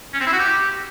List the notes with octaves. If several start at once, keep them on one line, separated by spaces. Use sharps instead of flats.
C#4
C4
E4
F#4
G4